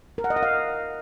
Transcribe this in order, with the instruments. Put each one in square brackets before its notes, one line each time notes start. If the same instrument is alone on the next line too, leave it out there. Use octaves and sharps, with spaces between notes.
[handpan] A#4
F#5
D#5
F#5
F5